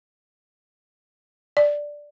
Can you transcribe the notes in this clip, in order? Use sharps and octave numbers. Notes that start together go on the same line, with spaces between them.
D5